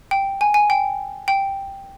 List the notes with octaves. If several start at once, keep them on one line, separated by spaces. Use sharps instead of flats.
G5
G#5
G#5
G5
G5